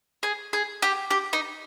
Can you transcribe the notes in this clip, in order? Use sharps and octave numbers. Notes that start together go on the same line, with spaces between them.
G#4
G#4
G4
G4
D#4